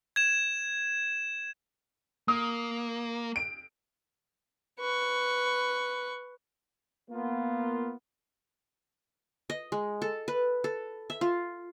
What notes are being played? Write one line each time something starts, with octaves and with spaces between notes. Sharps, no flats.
G#6 E7
A#3 D#6
D7
B4 C#6
A#3 B3 F4
D#5
G#3
A4
B4
A4
E5
F4